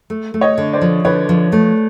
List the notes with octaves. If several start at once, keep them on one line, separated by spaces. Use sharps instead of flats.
A3
A3
C#5 D#5
D3
C5 D5
F3
D3 B4 C#5
F3
A3